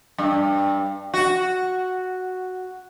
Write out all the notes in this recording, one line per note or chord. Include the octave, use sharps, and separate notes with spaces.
G2
F#4